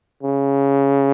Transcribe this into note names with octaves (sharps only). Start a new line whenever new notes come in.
C#3